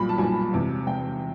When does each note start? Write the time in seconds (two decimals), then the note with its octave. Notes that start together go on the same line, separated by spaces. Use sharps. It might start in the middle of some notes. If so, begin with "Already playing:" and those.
Already playing: B1 A#2 G3 B5
0.09 A5
0.17 B1 A#2 G3 G#5
0.52 E1 E2 C3
0.87 C3 G5